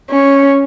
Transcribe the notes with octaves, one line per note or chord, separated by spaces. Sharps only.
C#4